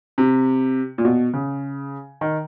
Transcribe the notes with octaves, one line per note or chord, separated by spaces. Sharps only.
C3
A#2
B2
C#3
D#3